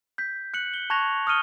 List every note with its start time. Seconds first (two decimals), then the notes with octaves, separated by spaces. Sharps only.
0.18 G6 B6
0.54 F#6 C#7 F#7
0.74 G7
0.90 A5 C#6 F#6 G#6 A#6 F7
1.27 D#6 F6 C#7 D#7 G7